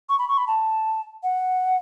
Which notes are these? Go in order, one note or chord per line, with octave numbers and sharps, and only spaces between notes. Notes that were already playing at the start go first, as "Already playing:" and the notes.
C#6
B5
C#6
B5
A5
F#5